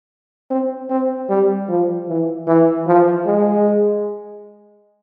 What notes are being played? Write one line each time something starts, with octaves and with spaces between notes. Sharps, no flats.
C4
C4
G3
F3
E3
E3
F3
G#3